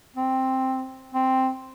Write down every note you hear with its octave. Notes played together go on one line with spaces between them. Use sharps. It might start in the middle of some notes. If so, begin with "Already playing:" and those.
C4
C4